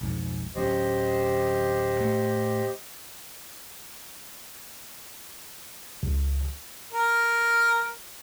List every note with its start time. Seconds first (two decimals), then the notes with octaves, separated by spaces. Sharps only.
0.01 B1 F2 G#2
0.55 D1 F#3 C#4 G4 C5 D#5
1.98 A2 A3
6.03 C#2
6.93 A#4